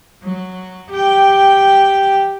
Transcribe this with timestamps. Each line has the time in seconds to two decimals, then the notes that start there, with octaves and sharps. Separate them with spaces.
0.22 F#3
0.91 G4 G5